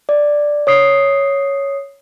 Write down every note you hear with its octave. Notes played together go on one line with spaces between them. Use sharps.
D5
C#5 D#6 C7